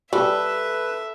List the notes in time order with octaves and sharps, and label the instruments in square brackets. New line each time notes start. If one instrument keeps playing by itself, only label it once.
[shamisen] G3 [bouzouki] A4 [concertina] B4 [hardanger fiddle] E5